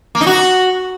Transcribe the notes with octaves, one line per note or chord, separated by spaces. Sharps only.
A#3
D#4
F#4